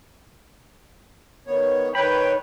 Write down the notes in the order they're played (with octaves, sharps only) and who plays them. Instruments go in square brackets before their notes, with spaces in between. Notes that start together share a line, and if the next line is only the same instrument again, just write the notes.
[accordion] D#3 B3 C#5
[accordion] D#3 B4 C#5 [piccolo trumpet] G5 [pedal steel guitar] B5